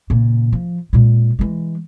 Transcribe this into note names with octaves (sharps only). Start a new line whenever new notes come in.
A#2 C#3
F3
A#2 G#3
E3 G#3